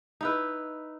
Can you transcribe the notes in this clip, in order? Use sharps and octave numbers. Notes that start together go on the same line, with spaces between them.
D#4 E4 B4